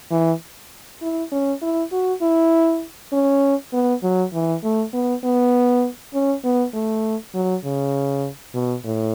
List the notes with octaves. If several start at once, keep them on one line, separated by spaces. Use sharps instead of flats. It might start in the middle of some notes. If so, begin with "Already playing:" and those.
E3
E4
C#4
E4
F#4
E4
C#4
B3
F#3
E3
A3
B3
B3
C#4
B3
A3
F#3
C#3
B2
A2